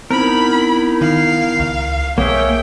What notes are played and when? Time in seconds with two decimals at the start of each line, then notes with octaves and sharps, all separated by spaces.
0.11 B3 C4 D#4 E4 A#4 B5
1.01 D#3 F5
1.60 C#2
2.18 B1 A#3 G#4 C#5 E5 G5